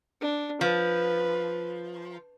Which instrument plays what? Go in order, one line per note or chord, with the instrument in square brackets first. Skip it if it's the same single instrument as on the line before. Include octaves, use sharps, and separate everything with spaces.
[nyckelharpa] D4
[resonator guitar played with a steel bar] F3 [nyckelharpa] B4